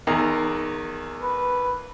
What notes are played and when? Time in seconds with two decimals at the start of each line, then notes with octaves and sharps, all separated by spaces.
0.07 E2 D#3 A#5
1.22 B4